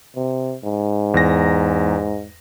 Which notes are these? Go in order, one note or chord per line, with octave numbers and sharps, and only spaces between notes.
C3
G#2
E2 A#6